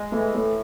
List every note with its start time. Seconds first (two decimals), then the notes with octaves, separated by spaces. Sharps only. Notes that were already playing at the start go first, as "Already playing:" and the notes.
Already playing: G#3
0.12 E3 A3
0.35 A2 A3